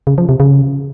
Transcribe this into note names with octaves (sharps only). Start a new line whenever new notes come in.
C#3
F3
C3
C#3